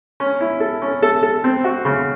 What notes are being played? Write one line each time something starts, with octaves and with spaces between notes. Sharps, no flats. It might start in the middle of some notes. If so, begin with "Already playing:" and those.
C#4
E4
A4
C#4
A4
A4
C4
F#4
C#3